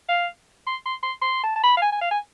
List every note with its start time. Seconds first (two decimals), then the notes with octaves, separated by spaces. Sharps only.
0.09 F5
0.67 C6
0.86 C6
1.03 C6
1.22 C6
1.44 A5
1.56 A5
1.64 B5
1.77 F5
1.82 G#5
1.92 G#5
2.01 F5
2.11 G#5